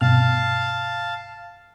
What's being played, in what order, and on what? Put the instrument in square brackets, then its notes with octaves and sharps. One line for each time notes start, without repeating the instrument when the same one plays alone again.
[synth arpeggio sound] G2 B2 F6 [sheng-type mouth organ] F5 A5